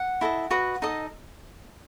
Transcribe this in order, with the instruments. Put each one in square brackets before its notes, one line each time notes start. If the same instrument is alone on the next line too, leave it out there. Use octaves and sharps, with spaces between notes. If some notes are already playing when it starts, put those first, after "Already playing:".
Already playing: [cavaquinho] F#5
E4 A4 D#5
F#4 B4 D#5
D#4 A4 D#5